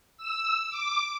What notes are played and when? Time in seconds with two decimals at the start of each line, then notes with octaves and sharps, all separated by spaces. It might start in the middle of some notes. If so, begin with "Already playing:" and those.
0.17 E6
0.70 D6